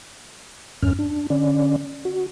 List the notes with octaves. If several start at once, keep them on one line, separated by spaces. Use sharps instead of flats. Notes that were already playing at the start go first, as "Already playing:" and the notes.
E2 G2 C#4 F6
D4
D3 C#4 D5
F#4